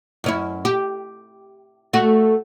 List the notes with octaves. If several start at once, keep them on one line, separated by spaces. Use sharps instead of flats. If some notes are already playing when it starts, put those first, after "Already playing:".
F#2 C#4 E4
G4
A3 F#4